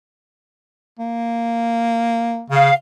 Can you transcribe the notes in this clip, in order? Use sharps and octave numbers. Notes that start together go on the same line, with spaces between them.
A#3
C#3 F5